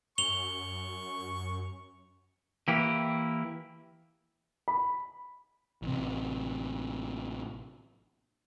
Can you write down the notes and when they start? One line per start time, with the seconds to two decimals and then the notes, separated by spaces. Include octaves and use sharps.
0.18 F#2 C#6 F7 G7
2.68 E3 A#3 E4 G4
4.68 B5
5.82 A1 C3